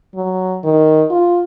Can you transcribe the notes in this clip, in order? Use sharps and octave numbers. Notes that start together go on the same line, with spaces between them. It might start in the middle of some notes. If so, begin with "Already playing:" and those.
F#3
D#3
F4